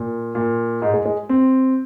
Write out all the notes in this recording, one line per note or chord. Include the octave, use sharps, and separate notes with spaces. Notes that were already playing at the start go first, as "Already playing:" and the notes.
Already playing: A#2
A#2
G#2
G#3
G#3
C4